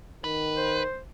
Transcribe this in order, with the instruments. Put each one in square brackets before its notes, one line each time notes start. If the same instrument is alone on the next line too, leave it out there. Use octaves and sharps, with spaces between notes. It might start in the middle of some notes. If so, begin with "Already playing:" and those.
[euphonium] D#3 [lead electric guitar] B4
[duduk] C5